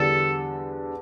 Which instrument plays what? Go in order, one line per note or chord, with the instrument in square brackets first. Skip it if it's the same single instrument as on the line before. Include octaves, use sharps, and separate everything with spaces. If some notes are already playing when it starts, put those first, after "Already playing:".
Already playing: [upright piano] E2 D3 G3 D4 [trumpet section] A4